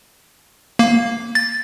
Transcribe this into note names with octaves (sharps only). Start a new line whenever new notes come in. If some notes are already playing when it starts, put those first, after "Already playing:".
A#3
A6